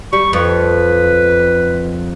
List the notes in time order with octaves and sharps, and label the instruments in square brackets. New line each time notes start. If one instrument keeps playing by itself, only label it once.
[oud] G3 [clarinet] C#6
[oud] F2 [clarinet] B4